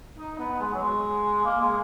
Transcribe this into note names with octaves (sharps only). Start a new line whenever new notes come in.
D#4
B3
G#3
F#3
G#3
A#3
G#3